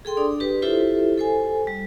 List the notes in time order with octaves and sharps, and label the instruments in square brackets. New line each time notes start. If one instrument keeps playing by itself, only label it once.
[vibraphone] G#4 A4 G5 C6
D4 D5 D#6
G4 B4
E4 F4 G4 A4 C5 E5
A4 C5 G#5
G3